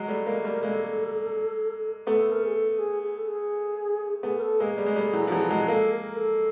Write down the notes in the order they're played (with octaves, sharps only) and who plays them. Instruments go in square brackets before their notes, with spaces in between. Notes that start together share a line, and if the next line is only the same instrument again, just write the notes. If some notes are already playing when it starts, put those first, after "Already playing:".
Already playing: [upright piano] F#3 G#3
G3 A3
[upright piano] G#3 A#3 [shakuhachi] A#4
[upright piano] G3 A3
[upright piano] G#3 A#3 [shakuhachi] A4
[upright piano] A3 B3 [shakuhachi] A4
[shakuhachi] A#4
G#4
A4
G#4
G#4
A4
G#4
[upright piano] A3 B3 [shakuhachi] G#4
[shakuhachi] A#4
A4
[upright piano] G#3 A#3 [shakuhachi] G#4
[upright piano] G3 [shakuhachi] G#4
[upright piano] G#3
G3 A3
E3 F#3
F3
E3 F#3
F#3 G#3
[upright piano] G#3 A#3 [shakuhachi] A4
[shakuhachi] A#4
A4